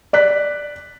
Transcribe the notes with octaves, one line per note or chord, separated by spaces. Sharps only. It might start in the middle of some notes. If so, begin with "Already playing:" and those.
D5 F#6 B6